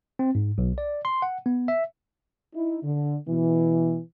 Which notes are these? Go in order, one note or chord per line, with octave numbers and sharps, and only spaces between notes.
C4
G#2
B1
D5
C6
F#5
B3
E5
D#4 E4
D3
B2 E3